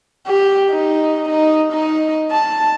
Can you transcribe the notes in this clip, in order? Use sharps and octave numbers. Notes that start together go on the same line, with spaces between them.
G4
D#4
D#4
D#4
A5